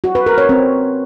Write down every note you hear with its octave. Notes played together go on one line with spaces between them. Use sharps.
F#4
B4
A#4
C#5
C4